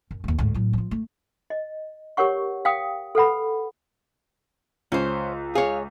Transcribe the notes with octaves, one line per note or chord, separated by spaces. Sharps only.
F#2
D#2 A3
D2 G#2
A2 F#3
F3 F4
A3
D#5
G4 A#4 C#5 F#5 C#6
F5 G5 D#6
A4 B4 F#5 B5
C#2 C#4 C5
G#4 C#5 F5